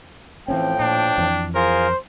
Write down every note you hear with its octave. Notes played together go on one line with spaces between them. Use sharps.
A2 E3 F3 C4 C#4 G5
A#2 D4
F2 E3
F4 G#4 A#4 C5